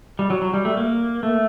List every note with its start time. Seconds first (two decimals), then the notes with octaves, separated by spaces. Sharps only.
0.19 G3
0.30 F#3
0.42 F#3
0.53 G3
0.65 A3
0.77 A#3
1.23 A3